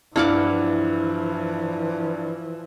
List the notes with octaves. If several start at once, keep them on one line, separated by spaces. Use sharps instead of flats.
G2 E3 F3 E4 F#5 D6 F6